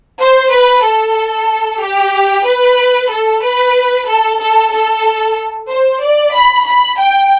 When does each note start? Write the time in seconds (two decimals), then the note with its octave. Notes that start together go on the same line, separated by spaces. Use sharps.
0.21 C5
0.53 B4
0.84 A4
1.82 G4
2.47 B4
3.11 A4
3.43 B4
4.08 A4
4.41 A4
4.73 A4
5.70 C5
6.03 D5
6.35 B5
6.66 B5
6.99 G5